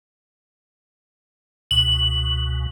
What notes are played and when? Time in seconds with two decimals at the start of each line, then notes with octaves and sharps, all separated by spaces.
1.71 C#2 B2 F#7